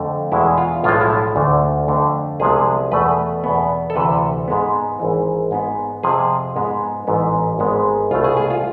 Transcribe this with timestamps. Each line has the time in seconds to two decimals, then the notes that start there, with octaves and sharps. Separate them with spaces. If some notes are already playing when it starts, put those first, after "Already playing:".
Already playing: F2 D3 A3
0.32 E2 B2 G#3 E4
0.58 F4
0.84 B1 A2 F3 G#3 F4
1.01 E4
1.36 D2 D3 A3
1.88 F2 D3 A3
2.40 C2 C3 F3 G#3 B3 G#4
2.92 E2 B2 A3 B4
3.44 E2 B2 B3
3.90 A4
3.96 D2 C3 E3 B4
4.48 G#2 G#3 B3
4.99 G#1 G#2 E3
5.51 G#2 G#3 B3
6.03 F2 C3 F3 G#4
6.56 G#2 G#3 B3
7.07 A1 G#2 E3 B3
7.59 G#1 G#2 G#3 B3
8.11 C2 B2 A3 F4
8.24 G#4
8.37 G#4
8.50 F4